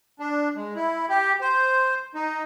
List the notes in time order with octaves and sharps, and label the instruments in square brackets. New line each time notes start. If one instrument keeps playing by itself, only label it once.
[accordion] D4
G#3
E4
G4
C5
D#4